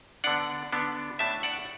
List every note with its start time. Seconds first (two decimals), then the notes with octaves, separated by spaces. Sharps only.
0.24 D3 B3 D4 D5 F#5
0.72 D3 B3 D4
1.19 A2 A3 D4 E5 A5
1.43 D5 F#5